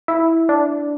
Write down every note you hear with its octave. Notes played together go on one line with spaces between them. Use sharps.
E4
D4